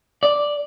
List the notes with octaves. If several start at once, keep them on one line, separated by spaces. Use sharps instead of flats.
D5